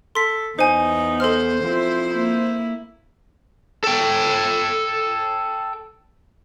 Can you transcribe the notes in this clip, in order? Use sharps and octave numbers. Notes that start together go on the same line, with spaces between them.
A4 C6 B6
E2 B3 D#4 C5 G#5
A4 C5 F6
F3 C4 E4
A#3 E4
A4 G5